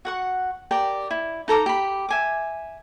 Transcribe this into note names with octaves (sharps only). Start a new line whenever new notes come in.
F#4 F#5 C#6
G4 A#4 D5 G5
E4
D#4 A4 A#5 D6
G4 B5
E5 G#5 D6